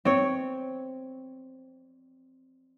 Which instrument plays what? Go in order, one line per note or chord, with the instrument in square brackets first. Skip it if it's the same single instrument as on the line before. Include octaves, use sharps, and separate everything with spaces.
[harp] C4 C#5